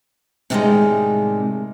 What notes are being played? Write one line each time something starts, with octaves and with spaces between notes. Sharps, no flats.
A2 C3 D#3 E3 G3 G#3